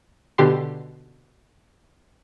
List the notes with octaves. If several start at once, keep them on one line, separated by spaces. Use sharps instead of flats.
B2 D3 G4 C6